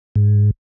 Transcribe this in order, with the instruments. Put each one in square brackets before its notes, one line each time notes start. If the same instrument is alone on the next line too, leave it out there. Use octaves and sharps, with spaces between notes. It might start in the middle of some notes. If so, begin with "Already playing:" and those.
[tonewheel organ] G#2